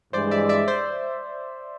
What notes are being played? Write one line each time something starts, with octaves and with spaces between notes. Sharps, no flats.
G2 E3 G#3 C5 D5
D5 E5
D5 E5
C5 D5